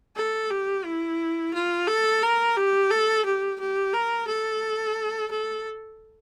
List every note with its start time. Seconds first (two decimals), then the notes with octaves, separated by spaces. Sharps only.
0.16 A4
0.50 G4
0.85 E4
1.54 F4
1.87 A4
2.23 A#4
2.57 G4
2.91 A4
3.25 G4
3.60 G4
3.94 A#4
4.27 A4
5.31 A4